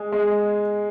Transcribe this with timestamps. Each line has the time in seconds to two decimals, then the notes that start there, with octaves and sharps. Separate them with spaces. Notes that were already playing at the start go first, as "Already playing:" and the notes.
Already playing: G#3
0.12 G#3